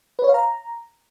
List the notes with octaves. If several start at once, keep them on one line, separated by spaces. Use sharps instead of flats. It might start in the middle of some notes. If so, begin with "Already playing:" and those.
B4
C#5
F5
A#5